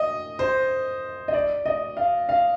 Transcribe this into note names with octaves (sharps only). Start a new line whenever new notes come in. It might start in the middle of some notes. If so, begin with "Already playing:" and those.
Already playing: D#5
C5
D#5
D5
D#5
F5
F5